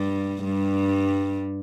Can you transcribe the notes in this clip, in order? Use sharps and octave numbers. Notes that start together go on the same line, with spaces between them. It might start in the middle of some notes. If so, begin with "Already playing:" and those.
Already playing: G2 G3
G2 G3